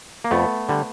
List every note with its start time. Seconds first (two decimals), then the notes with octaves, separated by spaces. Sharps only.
0.24 A#3
0.31 F2 A3 B3
0.69 D3 G3